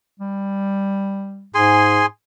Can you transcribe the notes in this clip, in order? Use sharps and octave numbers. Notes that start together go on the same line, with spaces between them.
G3
G#2 G#4 G#5 C6